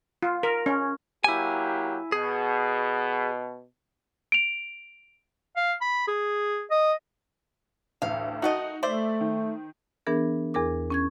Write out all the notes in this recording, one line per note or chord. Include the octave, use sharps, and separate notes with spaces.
F4
A#4
C#4
F#3 A#3 E4 G4 G#5
B2 G#4
D7 F7
F5
B5
G#4
D#5
A1 D2 F5
D#3 A3 D#4 F#4 D#5 F#5
A3 C5 D5 E5
D#3
E3 B3 D4 G#4 A#4
E2 G#4 A#4 D6
C#4 C#6 G#6